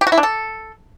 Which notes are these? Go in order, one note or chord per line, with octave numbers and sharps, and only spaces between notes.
G4
F#4
E4
D4
A4